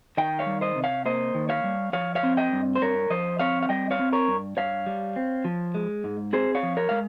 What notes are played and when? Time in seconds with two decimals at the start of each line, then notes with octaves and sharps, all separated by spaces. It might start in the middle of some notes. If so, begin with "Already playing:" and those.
0.17 D#3 D#5 G5
0.39 C#5 F5
0.46 G3
0.61 C5 D#5
0.76 C3
0.84 C#5 F5
1.05 A#3 C5 D#5
1.35 D#3
1.49 C#5 F5
1.64 G3
1.93 F3 C#5 F5
2.15 C#5 F5
2.23 C4
2.37 D#5 G5
2.52 G2
2.76 C5
2.82 G2 A#4 C#5
3.10 F3 C5 D#5
3.39 C4 C#5 F5
3.63 F5
3.69 G3 D#5 G5
3.91 C#5 F5
3.99 C4
4.13 A#4 C#5
4.28 G2
4.57 G2 C#5 F5
4.86 G3
5.16 C4
5.45 F3
5.75 G#3
6.04 G#2
6.33 C4 G#4 C5
6.55 C#5 F5
6.63 F3
6.77 A#4 C#5
6.89 G#3 F5